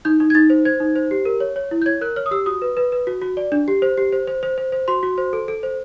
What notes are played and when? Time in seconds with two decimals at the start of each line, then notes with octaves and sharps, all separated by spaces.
0.05 D#4 G6
0.20 D#4
0.30 G#6
0.35 D#4 A6
0.50 C5
0.65 C5 G#6
0.80 D#4
0.96 C5
1.11 G4
1.25 A#4
1.40 C#5
1.56 C#5
1.71 E4
1.82 G6
1.86 C#5 G#6
2.01 A#4 F#6
2.16 C#5 F6
2.26 D#6
2.31 G4 E6
2.46 F#4 D#6
2.62 B4
2.77 B4
2.92 B4
3.07 F#4
3.21 F#4
3.37 D5
3.52 D4
3.68 G4
3.82 C5
3.97 G4
4.12 C5
4.27 C5
4.43 C5
4.58 C5
4.72 C5
4.88 F#4 C6
5.03 F#4
5.18 C5
5.33 A4
5.48 A4
5.63 C5